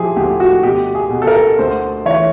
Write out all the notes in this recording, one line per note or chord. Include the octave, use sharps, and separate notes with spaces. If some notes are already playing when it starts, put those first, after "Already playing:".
Already playing: F3 G3 E4 G4 G#4
D2 G4
F#4
B2 G4
G#4
B2
A4
A#4
D2 C5
E3 C#5